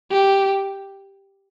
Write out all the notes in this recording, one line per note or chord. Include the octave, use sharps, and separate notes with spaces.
G4